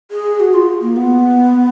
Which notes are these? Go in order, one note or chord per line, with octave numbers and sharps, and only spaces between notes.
G#4
F#4
F4
A#3
B3